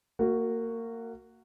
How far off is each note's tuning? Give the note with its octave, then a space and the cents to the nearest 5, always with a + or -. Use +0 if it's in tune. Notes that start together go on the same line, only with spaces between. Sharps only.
A#3 -25 F#4 +0